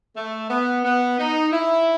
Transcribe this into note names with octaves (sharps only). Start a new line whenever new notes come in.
A3
B3
B3
D#4
E4